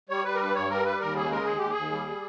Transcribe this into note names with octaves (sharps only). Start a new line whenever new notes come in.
G3 C#5
G3 B4
A#4
G2 B4
G2 C#5
G3 A#4
G3 B4
D#2 A#4
C#3 G#4
G#3 A#4
D#2 G#4
D#2 G4
G#4
D#2
G3
G3